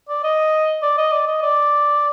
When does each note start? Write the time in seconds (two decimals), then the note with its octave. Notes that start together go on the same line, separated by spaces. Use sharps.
0.09 D5
0.24 D#5
0.82 D5
0.98 D#5
1.12 D5
1.27 D#5
1.42 D5